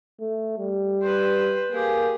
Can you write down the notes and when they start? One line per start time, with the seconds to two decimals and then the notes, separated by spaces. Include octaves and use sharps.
0.20 A3
0.58 G3
1.02 B4 C5
1.72 A#3 G4 G#4